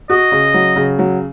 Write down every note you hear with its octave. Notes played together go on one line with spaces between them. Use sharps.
F#4 D#5
C#3
F#3
C#3
F#3